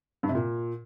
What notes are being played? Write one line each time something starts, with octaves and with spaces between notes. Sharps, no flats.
G2
C3
A#2